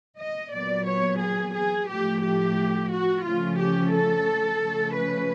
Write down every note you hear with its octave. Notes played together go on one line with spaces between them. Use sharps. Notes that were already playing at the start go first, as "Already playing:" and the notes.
D#5
A#2 F#3 B3 D5
C#5
G#4
G#4
A2 F3 A3 G4
G4
F#4
C#3 F3 A3 C#4 F4
G4
A4
C#3 F3 A3 C#4
B4